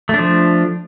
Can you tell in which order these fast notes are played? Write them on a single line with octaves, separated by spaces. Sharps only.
A3 D4 F3